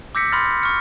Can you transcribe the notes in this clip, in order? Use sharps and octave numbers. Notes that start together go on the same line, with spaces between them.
D6 E6 G6 A#6 B6 C#7
B5 C6 F6 A6 A#6
C#6 F6 C#7